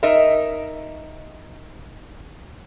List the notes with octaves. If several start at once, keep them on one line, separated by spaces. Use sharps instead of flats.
D#4 A#4 D#5 E5